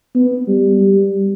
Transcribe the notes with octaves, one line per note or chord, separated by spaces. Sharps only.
B3
G3
G3